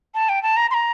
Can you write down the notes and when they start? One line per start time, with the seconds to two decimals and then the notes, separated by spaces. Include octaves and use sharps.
0.15 A5
0.29 G5
0.43 A5
0.57 A#5
0.71 C6
0.74 A#5